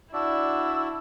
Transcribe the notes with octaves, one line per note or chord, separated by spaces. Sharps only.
D4 E4 F#4 D5 E6